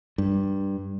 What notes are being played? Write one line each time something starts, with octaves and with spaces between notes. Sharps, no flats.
G2